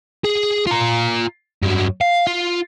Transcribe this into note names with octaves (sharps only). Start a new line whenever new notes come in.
G#4
F4 A#5
G2 F#3
F5
F4